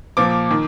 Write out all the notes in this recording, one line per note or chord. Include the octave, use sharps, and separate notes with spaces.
A#2 F3 D6
D#3